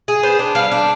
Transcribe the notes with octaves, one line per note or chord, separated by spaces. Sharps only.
G#4
B3 C5
D4
G3 F5
D4